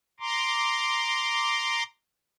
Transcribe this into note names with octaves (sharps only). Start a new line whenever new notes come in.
A#5 C6 D6